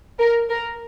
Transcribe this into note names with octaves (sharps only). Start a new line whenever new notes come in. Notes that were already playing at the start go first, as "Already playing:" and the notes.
A#4
A#4